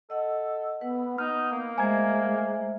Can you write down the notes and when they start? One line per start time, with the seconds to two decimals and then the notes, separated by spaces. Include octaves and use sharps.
0.10 A4 D#5 F#5
0.81 B3 B4 F#5
1.18 B3 D#4 F6
1.52 A#3
1.78 G#3 A3 C5 E5 G#5 A#5 G#6